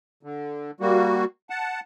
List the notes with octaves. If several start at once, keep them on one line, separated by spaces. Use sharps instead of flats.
D3
G3 A#3 F#4
F#5 A5